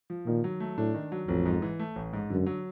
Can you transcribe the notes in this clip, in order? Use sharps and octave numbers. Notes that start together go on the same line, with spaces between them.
F3
A#2 D#3
F#3
A3
A2 D4
D#3
F#3
A1 F2
G#2
E3
A3
A1
G#2
F#2 D3
F#3